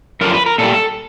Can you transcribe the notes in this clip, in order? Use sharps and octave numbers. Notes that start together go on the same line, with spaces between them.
F#2 D3 F3 A#4
B4
A#4
A#2 G3 A4